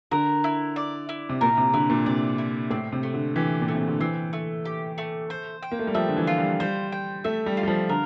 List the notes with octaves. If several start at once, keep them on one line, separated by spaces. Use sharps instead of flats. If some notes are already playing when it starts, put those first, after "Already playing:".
D3 A#4
E4
D5
E4
C3
A#2 A#4
C3
D3 E4
A#2
C3 D5
E4
A2 C4
C3
A3
D3
E3 G4
A#2
A3
C3
D3
E3 C4
A3
G4
A3
C5
G5
A#3
A3
G3
F3 E5
D3
E3
F4
G3
G3 C5
G5
A3 E5
G3
F4
G3
F3
D3 A#4